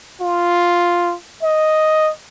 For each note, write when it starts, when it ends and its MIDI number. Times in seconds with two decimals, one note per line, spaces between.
0.21 1.15 65
1.43 2.11 75